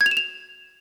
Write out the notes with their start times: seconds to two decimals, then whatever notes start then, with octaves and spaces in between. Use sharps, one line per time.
0.01 G#6
0.06 F7
0.11 E7
0.17 F7